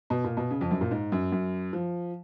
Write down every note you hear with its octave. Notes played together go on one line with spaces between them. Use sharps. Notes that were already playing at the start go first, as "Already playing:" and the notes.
B2
A#2
B2
C#3
F2
F#2
A#2
G#2
F#2
F#2
F3